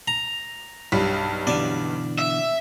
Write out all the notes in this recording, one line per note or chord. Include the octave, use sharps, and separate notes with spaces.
A#5
B1 G2
B2 D3 E3 D5
E5